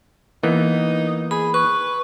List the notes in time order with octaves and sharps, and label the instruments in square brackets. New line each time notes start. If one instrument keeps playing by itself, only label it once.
[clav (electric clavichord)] E3 A#3 B3 [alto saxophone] D#4
[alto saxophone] G#4 [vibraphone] B5
[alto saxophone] B4 [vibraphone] C#6